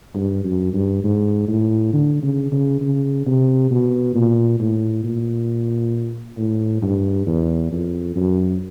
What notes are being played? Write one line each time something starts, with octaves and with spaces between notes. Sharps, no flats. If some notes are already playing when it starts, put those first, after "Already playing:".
G2
F#2
G2
G#2
A2
D3
C#3
C#3
C#3
C3
B2
A#2
A2
A#2
A2
G2
E2
F2
F#2